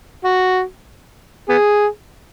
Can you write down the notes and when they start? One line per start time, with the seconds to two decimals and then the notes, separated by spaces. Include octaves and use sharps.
0.24 F#4
1.49 B3 G#4